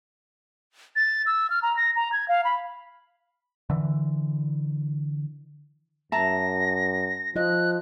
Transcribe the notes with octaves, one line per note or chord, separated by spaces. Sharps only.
A6
E6
F6
A#5
A#6
A#5
G#6
F5
B5
D3 E3
F#2 E5 A5 A#5 A#6
F3 F4 D#5 F#6